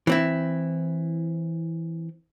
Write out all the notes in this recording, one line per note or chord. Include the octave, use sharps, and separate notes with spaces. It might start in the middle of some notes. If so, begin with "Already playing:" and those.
E3 C4 E4